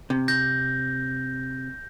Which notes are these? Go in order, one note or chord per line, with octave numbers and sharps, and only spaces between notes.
C3
G6 A#6